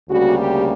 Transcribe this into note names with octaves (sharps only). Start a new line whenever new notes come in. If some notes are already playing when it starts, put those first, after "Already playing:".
D2 C#3 G3 A#3 F#4
G4